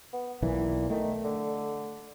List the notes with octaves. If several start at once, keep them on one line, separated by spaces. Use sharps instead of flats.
B3
B1 A#2 E3
D#3 A3
D3